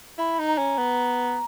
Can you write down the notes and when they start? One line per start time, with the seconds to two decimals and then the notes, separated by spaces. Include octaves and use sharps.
0.18 E4 B5
0.39 D#4
0.48 A#5
0.58 C#4
0.78 B3